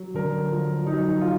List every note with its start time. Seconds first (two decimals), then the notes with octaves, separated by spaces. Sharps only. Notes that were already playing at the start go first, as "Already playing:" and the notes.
Already playing: F#3
0.14 D3 A#4
0.51 F3
0.86 F#3 D#4
1.21 F#3 F4